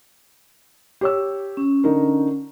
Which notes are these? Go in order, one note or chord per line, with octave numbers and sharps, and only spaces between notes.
G4 C#5 E6
C#4
D3 D#4 A#4